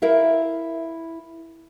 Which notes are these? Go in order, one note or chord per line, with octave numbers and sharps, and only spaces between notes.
E4 A#4 E5 F5